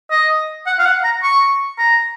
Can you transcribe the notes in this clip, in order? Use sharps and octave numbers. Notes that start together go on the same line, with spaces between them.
D#5
F#5
F5
F#5
A#5
C#6
A#5